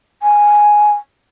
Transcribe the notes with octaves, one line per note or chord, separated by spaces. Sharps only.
G#5